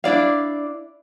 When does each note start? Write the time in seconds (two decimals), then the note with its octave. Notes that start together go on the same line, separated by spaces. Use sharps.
0.04 D4 E4 D5 F5